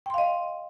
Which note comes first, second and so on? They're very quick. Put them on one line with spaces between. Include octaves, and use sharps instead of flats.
G5 C6 F5 D#5